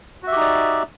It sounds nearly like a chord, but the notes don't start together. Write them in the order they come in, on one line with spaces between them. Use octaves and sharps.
F#4 E5 G4 D#4 D5